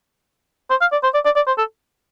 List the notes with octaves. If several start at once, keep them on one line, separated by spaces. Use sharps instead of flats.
C5
F5
D5
C5
D5
D5
D5
C5
A4